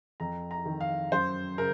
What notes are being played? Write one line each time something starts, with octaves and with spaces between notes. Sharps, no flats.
F2 A#5
A#5
D#3
F5
F#2 C5
C#3 A#4